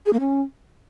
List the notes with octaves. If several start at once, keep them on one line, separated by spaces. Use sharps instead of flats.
G#4
A#3
C#4